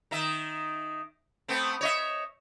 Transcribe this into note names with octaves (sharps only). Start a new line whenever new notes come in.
D#3 D#4 E5
A3 B3 C4
C#5 D#5 E5